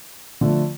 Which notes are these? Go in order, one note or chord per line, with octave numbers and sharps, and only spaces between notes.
D3 F3 A3